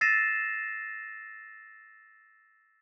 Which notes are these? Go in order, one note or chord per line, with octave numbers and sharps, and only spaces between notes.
E6 A6 A#6 C7 D#7 E7